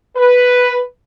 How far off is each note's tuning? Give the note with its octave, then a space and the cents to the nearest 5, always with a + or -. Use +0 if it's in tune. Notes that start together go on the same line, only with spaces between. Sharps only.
B4 +0